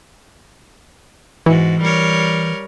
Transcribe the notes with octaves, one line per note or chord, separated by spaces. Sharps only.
G#2 E3 F#4
G3 A#4 C#5